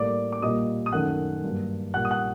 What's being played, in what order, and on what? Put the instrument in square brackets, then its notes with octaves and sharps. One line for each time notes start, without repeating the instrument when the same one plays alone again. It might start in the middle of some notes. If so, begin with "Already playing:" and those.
Already playing: [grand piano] A2 G3 A#3 D5 D6
D6
A#2 G3 A#3 D#5 D#6
D#6
F#2 D#3 A3 F#5 F#6
G2 F#3 A#3
A#2 G3 A#3 F#5 F#6
D#6
F#5 F#6